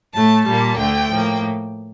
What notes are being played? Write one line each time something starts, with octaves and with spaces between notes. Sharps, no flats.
A2 A3 A5
A#2 G3 A#3 A5
D2 D3 A3 G5
A2 F3 A#3